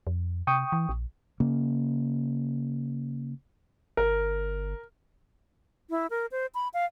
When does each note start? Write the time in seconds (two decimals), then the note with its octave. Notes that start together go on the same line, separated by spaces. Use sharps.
0.07 F2
0.47 C3 G5 C#6 D#6
0.72 E3
0.89 A#1
1.40 C#3 A#3 C#4
3.97 G1 A#4
5.90 E4
6.10 A#4
6.32 C5
6.55 B5
6.74 F5